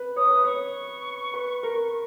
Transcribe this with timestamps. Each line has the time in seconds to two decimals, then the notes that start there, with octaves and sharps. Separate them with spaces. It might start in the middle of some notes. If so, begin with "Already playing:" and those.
Already playing: B4
0.16 C#5 D#6
0.30 B4
0.44 C#5 C#6
1.34 B4
1.63 A#4